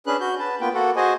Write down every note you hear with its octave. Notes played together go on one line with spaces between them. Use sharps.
C#4 D4 G#4 B4 F#6
F#4 G6
B4 A5
A#3 B3 F4 B4 G5
A#3 F#4 A4 F#5
F#4 G#4 C5 D#5 G#5